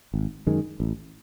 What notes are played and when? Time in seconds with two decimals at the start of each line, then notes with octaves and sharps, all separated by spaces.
0.14 G#1
0.47 F#2 D#3 G#3
0.80 A1